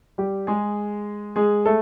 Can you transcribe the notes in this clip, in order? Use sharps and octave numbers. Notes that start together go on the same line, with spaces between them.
G3 G4
G#3 G#4
G#3 G#4
A3 A4